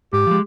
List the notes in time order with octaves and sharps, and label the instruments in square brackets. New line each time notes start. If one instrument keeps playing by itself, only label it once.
[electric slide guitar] G#2 [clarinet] G4
[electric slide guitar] F3 G#3